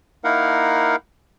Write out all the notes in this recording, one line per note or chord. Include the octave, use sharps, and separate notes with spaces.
A#3 D#4 E4 A#4 F5 F#5